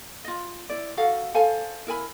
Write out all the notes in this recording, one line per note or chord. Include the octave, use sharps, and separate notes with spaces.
F4 D#5
E4 D5
F#4 A4 F5 F#5
A4 C5 F5 G#5
E4 A#4 G#5 B5